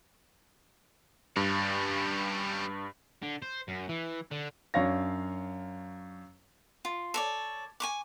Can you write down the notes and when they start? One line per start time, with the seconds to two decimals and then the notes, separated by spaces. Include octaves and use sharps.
1.37 G2 G3 C#4
3.23 D3
3.42 C5
3.68 F#2
3.89 E3
4.31 D3
4.74 F#2 D4 C#5 F5 A#6
6.85 F4
7.14 A4 C#5 D5
7.80 G#5 C#6 D6